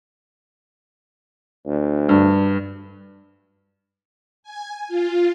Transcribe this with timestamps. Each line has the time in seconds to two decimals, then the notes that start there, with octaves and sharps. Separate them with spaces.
1.66 D2
2.09 G2
4.43 G#5
4.88 F4